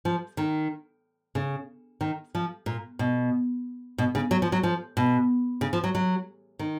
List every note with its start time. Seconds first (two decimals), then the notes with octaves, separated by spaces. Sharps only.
0.05 F3
0.37 D#3
1.35 C#3
2.01 D#3
2.35 F3
2.66 A#2
2.99 B2
3.98 B2
4.15 C#3
4.31 F#3
4.42 F3
4.52 F#3
4.63 F3
4.97 B2
5.61 C#3
5.73 F3
5.84 F#3
5.95 F#3
6.59 D#3